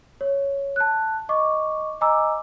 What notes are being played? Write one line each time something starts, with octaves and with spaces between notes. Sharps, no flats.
C#5
A5 F#6
D#5 C#6 D6
D#5 G#5 A#5 D6 E6